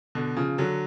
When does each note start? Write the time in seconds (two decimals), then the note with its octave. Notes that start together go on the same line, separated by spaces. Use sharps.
0.15 B2 D3
0.36 C#3 F3
0.58 D3 F#3